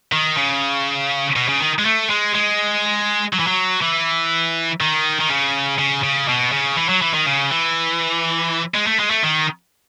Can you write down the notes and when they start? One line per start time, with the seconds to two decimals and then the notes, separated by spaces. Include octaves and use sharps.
0.13 D#3
0.37 C#3
1.36 B2
1.49 C#3
1.60 D#3
1.79 G#3
1.85 A3
2.10 G#3
2.34 G#3
3.33 F#3
3.40 E3
3.48 F#3
3.82 E3
4.81 D#3
5.21 D#3
5.29 C#3
5.79 C#3
6.03 C#3
6.28 B2
6.52 C#3
6.77 E3
6.89 F#3
7.02 E3
7.14 D#3
7.26 C#3
7.51 E3
8.74 G#3
8.87 A3
8.99 G#3
9.11 A3
9.23 D#3